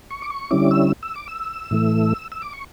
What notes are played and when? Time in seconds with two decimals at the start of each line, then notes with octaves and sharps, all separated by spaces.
0.10 C#6
0.22 D6
0.30 C#6
0.51 D3 G3 C#4 E4 D6
0.71 E6
1.03 E6
1.16 D6
1.28 E6
1.71 A2 E3 A3
2.32 E6
2.42 D6
2.53 C#6